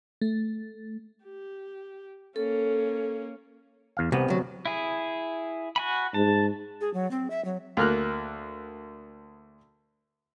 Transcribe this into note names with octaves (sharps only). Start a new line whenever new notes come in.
A3
G4
A#3 C#4 A4
E2 F5
C2 C3 B3
D2 F#3
E4 G#4
F#4 G#5 B5
G#2 A5
G#4
F#3
C4
E5
F#3
D2 A#3 F6 F#6